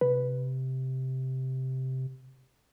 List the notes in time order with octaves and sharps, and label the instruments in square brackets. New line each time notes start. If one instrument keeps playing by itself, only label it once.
[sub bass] C3 [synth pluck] B4